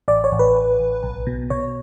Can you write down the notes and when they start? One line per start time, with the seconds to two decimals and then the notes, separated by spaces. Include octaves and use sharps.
0.08 A1 D5
0.24 C#5
0.32 A1
0.39 B4
0.55 A1
0.79 A1
1.03 B1
1.27 B2
1.50 B2 C#5